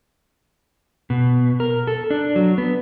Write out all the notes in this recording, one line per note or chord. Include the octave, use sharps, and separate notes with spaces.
B2
A#4
A4
D4
F#3
B3